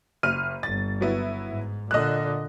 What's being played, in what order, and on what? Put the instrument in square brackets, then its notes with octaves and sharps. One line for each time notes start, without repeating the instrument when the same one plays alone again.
[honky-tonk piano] F#1 F6 D#7
[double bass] G1 [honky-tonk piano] A6
[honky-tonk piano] F#3 B3 E4
[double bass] G#2
[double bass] A#2 D3 [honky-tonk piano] D#5 F#6